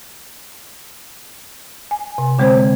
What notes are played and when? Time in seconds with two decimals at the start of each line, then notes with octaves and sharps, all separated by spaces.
1.91 G#5
2.18 C3
2.39 D3 G#3 C4 C5 G#6